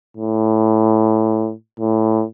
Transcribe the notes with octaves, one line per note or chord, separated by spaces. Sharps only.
A2
A2